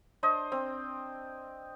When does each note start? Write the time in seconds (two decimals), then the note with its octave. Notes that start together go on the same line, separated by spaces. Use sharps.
0.23 D4 C5 D#5
0.52 C4